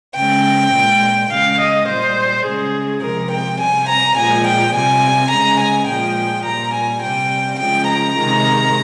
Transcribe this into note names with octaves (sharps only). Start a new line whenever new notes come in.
C#3 G#3 G5
A#2 G#3
C#3 G#3 F5
D#5
A#2 G3 C5
C#3 G#3 G#4
C3 F3 G#3 A#4
G5
C3 G3 G#5
A#5
A#2 F3 G#3 G#5
G5
C3 G3 G#5
C#3 G#3 A#5
G#5
A#2 F3 G#3 G5
A#2 G3 A#5
G#5
C3 G3 G5
C#3 F3 G#3 G5
A#5
C3 D#3 G#3